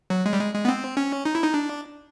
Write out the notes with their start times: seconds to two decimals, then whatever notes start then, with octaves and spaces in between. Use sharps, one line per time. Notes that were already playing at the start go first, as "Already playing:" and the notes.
0.10 F#3
0.26 G#3
0.33 G3
0.40 G#3
0.54 G#3
0.65 B3
0.68 C4
0.97 C#4
1.25 D#4
1.35 E4
1.43 D#4
1.54 D4